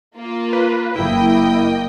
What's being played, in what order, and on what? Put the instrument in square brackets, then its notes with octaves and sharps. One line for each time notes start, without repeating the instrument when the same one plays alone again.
[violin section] A#3 F4
[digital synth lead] B4
[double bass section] F#1 A#3 [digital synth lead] E4 [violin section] D#5 G5